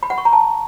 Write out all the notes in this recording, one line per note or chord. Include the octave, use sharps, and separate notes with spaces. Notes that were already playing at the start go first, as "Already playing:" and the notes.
B5
F#5
C#6
A#5
A5